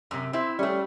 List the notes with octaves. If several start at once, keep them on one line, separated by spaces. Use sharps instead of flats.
F#2 C3
C4 E4
G3 A3 C#4